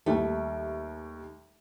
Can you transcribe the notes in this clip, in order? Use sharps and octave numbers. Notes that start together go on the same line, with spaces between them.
D#2 G3 A3